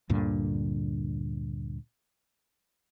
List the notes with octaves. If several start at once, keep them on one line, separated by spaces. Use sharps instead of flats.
D2 G2 A#2 D3